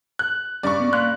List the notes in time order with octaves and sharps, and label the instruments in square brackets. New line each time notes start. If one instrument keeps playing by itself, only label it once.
[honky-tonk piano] F#6
[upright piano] G2 C#3 G3 [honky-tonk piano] D5 C#6
[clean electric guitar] B3
[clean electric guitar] A#3 F5 C6 [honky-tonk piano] F#6